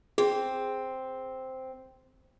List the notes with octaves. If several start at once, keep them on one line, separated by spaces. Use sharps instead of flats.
C4 G#4